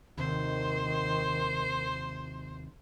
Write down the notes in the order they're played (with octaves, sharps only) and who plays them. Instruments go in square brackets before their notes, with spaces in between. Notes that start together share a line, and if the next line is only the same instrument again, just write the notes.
[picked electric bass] D#2 C3 [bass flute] D#3 [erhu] C5